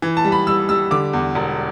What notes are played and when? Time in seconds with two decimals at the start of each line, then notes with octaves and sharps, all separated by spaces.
0.02 E3
0.17 A5
0.24 G3
0.32 B5
0.47 G3 E6
0.69 G3 E6
0.91 D3 D6
1.13 E2
1.35 E1